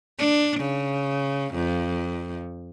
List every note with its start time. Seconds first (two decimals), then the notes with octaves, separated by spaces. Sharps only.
0.18 D4
0.60 C#3
1.54 F2